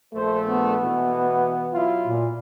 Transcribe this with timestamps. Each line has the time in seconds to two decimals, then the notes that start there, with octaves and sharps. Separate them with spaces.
0.14 A#1 A3 C5
0.45 B3
0.83 B2 E3
1.72 F#3 E4 F4
2.07 A#2